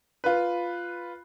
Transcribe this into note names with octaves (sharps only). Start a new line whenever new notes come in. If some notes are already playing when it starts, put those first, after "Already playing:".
F4 B4